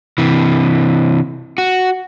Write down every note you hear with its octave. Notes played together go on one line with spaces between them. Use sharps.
C3 E3
F#4